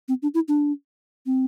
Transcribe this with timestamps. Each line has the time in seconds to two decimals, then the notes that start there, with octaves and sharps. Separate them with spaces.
0.09 C4
0.22 D4
0.34 E4
0.48 D4
1.26 C4